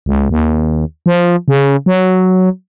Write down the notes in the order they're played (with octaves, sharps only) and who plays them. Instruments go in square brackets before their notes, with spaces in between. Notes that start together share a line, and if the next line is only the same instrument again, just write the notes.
[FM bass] C#2
D#2
F3
C#3
F#3